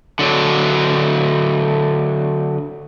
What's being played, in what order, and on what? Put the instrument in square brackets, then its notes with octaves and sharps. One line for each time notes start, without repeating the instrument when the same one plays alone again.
[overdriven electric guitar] D3 F#3